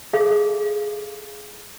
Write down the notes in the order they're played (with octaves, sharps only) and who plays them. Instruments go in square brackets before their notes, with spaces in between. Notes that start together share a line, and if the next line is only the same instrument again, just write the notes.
[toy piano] G#4 A4 F5